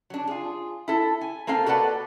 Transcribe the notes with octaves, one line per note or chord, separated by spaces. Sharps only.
F#3 D4
F4 G#4
E4 A4
G#5
A#3 C4 A4 F5
F#4 A4 B4 D5 F#5